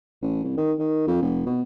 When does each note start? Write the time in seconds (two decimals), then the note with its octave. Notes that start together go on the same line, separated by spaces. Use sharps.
0.22 A1
0.44 C2
0.57 D#3
0.79 D#3
1.07 F2
1.22 F1
1.46 B2